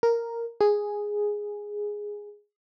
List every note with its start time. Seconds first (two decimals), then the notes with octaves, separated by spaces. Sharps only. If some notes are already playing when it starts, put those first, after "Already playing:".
0.03 A#4
0.61 G#4